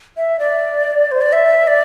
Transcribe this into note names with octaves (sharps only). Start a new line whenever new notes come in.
E5
D5
C5
D5
E5
D5